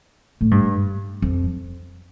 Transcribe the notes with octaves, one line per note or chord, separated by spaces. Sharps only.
A2
G2
F2